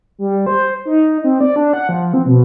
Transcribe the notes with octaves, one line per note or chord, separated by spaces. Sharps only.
G3
C5
D#4
C4
D5
D4
F#5
F3
C4
B2